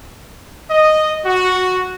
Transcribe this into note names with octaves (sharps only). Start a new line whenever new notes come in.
D#5
F#4